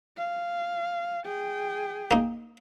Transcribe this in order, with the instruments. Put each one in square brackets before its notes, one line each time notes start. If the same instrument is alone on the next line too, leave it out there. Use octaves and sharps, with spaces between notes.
[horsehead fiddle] F5
G#4 G5
[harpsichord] A#3 D#4